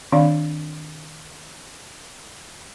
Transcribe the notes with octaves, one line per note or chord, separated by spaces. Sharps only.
D#3 C4 D4 D5 F5